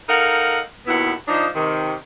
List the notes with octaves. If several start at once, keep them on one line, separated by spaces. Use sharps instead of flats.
D#4 A4 A#4 F5 F#5
D#2 B2 B3 E4 F#5
F3 D4 D#4
C3 D#3